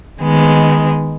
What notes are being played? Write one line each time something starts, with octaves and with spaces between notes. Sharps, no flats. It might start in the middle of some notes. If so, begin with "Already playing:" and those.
D#3 G#3 B3